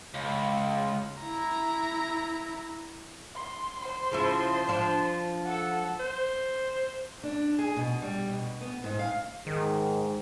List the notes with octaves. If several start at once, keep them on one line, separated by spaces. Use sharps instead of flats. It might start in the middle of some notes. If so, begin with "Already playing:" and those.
C#2
E4 A#5
C6
C5 C6
C#3 F3 E4
F3 D4
A4 F#5
C5
D4
G#4
B2
G3
B2
B3
G#2
F5
G#2 D#3